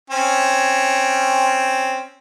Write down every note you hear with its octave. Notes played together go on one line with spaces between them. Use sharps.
C4 C#4